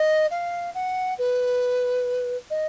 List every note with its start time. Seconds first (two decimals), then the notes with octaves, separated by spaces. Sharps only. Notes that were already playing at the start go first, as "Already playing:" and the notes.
Already playing: D#5
0.30 F5
0.74 F#5
1.18 B4
2.50 D#5